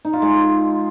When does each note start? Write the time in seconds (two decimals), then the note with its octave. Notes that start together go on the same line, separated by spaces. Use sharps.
0.05 D#4
0.13 F4
0.22 G#3